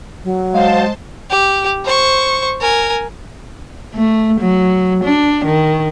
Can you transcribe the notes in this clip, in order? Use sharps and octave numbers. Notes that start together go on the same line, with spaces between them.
F#3
G#3 C5 F5 A5
G4
C5 C#6
A#4 G#5
A3
F#3
D4
D#3